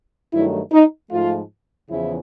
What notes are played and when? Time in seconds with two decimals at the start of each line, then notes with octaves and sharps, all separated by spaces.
0.32 G2 D#3 F#3 A3 E4
0.72 D#4
1.11 G#2 F3 A3 F4
1.90 E2 C#3 F3 E4